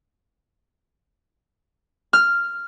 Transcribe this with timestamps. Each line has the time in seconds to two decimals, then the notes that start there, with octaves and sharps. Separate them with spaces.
2.13 F6